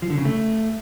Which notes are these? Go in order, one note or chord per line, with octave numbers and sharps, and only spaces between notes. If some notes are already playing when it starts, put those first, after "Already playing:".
F3
D3
C#3
A3